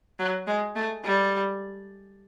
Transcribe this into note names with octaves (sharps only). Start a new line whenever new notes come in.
F#3
G#3
A3
G3